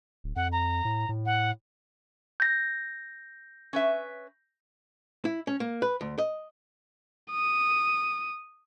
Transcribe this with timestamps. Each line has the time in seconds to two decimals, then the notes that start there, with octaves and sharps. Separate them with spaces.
0.24 D1
0.36 F2 F#5
0.52 A#5
0.85 A2
1.09 A2
1.26 F#5
2.40 G6 A#6
3.73 C#4 B4 E5
5.25 E4
5.47 C#4
5.60 A#3
5.82 B4
6.01 D2
6.18 D#5
7.31 D#6